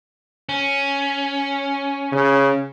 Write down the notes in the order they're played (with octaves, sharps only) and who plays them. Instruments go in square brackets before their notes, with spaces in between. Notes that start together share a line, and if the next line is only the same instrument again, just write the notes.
[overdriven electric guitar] C#4
[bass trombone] C#3